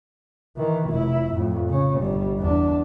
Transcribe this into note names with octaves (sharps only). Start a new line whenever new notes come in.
D#3 E3
F1 E4
F2 A2
C#3 C#4
G1 G3
E2 D4